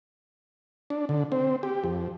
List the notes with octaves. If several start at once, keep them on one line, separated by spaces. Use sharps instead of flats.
D4
D3
C4
G4
F2